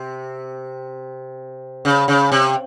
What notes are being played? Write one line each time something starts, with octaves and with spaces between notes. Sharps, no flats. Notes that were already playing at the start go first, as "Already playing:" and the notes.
Already playing: C3
C#3
C#3
C3